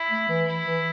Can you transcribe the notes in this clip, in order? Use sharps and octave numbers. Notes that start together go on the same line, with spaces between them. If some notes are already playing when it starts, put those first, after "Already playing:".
Already playing: E4
A3
E3
E4
E3